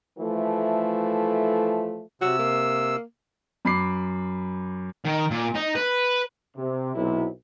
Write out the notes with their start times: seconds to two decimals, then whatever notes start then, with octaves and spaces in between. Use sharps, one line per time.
0.19 E3 F3 A3
2.22 C3 F#4 E6
2.39 A#3
3.65 F#2 B5 D6 C7
5.05 D#3
5.30 A#2
5.55 D#4
5.75 B4
6.56 C3
6.95 B1 C3 E4